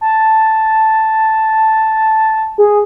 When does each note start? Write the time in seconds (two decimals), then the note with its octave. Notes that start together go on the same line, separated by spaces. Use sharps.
0.01 A5
2.58 G#4